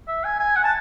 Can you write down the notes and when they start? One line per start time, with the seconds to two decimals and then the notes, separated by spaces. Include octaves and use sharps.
0.08 E5
0.24 G#5
0.40 G#5
0.56 F#5
0.64 A5